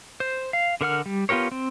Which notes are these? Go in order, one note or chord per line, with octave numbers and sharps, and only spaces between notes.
C5
F5
D3 A#4 F#5 F6
G3
B3 F4 G4 A#4 C#5
C4